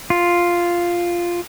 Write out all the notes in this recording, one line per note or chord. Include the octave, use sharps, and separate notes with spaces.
F4